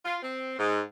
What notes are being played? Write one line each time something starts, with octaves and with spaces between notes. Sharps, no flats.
F4
C4
G#2